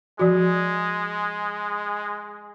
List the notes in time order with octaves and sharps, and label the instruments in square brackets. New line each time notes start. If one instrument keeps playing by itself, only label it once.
[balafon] F3 F#4 [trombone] G#3